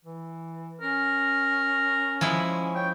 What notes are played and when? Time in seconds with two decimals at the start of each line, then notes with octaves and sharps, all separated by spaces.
0.05 E3
0.80 C#4 A#4
2.21 F3 G#3 E4
2.75 C#5 G5